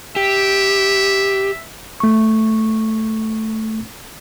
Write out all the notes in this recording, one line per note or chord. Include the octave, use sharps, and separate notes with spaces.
G4 E5
A3 C#6